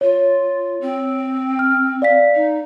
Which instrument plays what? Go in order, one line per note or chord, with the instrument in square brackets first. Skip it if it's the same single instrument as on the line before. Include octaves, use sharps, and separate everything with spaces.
[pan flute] F4 [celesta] C#5
[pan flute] C4
[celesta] F6
D5 F5 B6
[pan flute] D#4